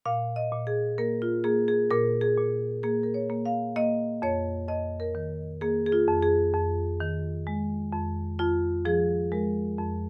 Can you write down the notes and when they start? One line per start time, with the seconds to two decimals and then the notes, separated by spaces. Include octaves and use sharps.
0.05 A#2 F5
0.36 D#5
0.52 A#2
0.67 G#4
0.98 A#3 A#4
1.22 F4
1.44 A#3 G#4
1.68 G#4
1.91 A#2 A#4
2.21 G#4
2.37 A#2
2.83 A#3 G#4
3.03 A#4
3.14 C#5
3.30 A#3
3.45 F5
3.76 A#3 D#5
4.22 F2 C#5
4.68 F2 D#5
5.00 A#4
5.15 D#3
5.61 A#3 G#4
5.86 G#4
5.92 F4
6.08 F2
6.23 G#4
6.54 F2
7.00 D#3
7.47 G#3
7.93 F2
8.39 F2 F4
8.85 F3 G#4
9.32 G#3 A#4
9.78 F2